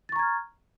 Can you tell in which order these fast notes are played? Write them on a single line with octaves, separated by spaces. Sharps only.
A6 C#6 A#5 G#6 F6